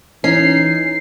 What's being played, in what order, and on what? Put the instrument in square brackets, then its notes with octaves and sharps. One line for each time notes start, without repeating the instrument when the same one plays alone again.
[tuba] E3 [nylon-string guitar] C#4 [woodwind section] D#4 [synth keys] C7